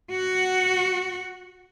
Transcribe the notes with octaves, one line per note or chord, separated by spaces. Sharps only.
F#4 F#5